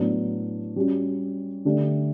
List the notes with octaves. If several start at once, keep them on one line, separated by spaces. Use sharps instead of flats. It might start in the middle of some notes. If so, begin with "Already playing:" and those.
Already playing: A2 F#3 B3 D4
G3 C#4 F#4
D3 A3 D4 G4